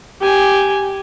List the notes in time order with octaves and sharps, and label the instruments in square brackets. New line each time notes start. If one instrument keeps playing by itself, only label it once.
[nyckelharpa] G4 G#5